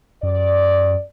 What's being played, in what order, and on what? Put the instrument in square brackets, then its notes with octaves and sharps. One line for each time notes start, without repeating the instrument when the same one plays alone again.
[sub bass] F#2 [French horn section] D5